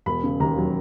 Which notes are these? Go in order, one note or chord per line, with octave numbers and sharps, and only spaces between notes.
E1 B5
C#3
D#2 A#5
F#3